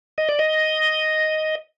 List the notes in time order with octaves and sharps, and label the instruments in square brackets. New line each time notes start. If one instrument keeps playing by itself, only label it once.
[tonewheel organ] D#5
D5
D#5